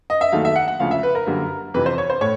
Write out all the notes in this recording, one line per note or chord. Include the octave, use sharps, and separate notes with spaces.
D#5
E5
D#2 D#3 F#3 A3 F5
E5
F#5
F#5
D2 C#3 F3 G#3 F5
E5
B4
A#4
F#2 D3 G3 A#3
F2 C3 E3 B4
C5
C#5
C5
A2 C#5